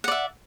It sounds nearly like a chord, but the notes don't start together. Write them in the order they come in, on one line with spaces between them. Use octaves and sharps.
F#5 D5 E5